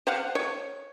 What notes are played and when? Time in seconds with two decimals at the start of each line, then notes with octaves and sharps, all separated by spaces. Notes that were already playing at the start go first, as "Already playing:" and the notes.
0.07 C5 F5 F#5
0.35 C#5